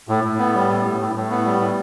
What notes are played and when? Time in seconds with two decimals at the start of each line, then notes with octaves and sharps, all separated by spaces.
0.08 A2
0.24 A2
0.38 B3
0.55 G3
0.69 A2
0.84 A2
1.00 A2
1.15 A2
1.30 B3
1.45 G3
1.61 A2